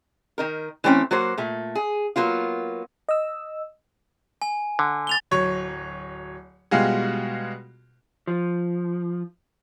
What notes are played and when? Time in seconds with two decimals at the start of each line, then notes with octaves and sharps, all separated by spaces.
0.38 D#3 D#4 A#4
0.84 E3 A3 C4 C#4
1.11 F#3 A#3 F#4 C5
1.38 A#2 A3
1.75 G#4
2.16 F#3 A#3 B3 F4
3.09 D#5 E6
4.42 G#5
4.79 D3
5.07 A6 F7 G7
5.31 D1 F#3 C#5
6.71 B2 G3 G#3 F4 F#4 G#4
8.27 F3